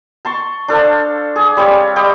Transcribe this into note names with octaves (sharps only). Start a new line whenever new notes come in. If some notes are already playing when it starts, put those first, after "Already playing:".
A5 C6 C#6
D4 A4 C5 F5
G#4
G3 C4 C#5 F5
G3 D#5 G5 D6